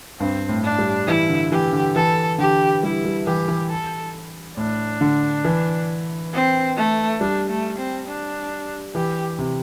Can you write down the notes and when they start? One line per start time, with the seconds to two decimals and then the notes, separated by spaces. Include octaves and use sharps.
0.20 G2 C4
0.49 A2
0.64 D4
0.79 G3
1.07 E3 E4
1.29 D3
1.52 E3 G4
1.73 D3
1.96 E3 A4
2.38 D3 G4
2.83 G3 E4
3.05 G3
3.26 E3 G4
3.48 E3
3.70 A4
4.57 A2 D4
5.01 D3
5.45 E3
6.33 C4
6.76 A3
7.20 G3 D4
7.50 A3
7.78 C4
8.08 D4
8.95 E3 G4
9.39 C3